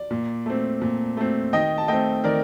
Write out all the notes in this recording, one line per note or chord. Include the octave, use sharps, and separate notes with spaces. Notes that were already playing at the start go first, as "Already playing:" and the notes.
Already playing: D5
A#2
A3 C4
A#2
A3 C4
D#3 D#5 G5
A5
A3 C4 D#5 G5
D#3 A#4 D5